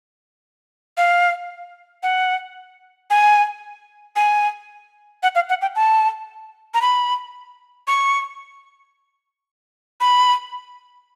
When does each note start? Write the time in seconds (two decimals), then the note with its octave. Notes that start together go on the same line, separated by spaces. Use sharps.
0.97 F5
2.03 F#5
3.10 G#5
4.16 G#5
5.23 F#5
5.35 F5
5.49 F#5
5.62 G5
5.76 A5
6.74 A#5
6.82 B5
7.87 C#6
10.01 B5